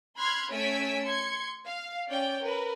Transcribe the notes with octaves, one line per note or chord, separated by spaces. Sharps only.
B5 C6 F6 F#6 G#6
A3 C#4 G#5 E6 B6 D7
C6 G#6 C#7
F5
C#4 D5 G5
A#4 B4